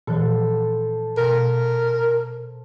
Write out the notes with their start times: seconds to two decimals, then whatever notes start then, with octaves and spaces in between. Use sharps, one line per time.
0.07 A#2 E3 F3 A4 C5
1.17 B2 A#4